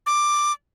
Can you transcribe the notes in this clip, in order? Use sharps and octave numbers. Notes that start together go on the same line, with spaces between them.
D6